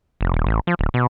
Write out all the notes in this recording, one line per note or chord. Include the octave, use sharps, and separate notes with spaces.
F1
D#1
A1
F3
D1
B2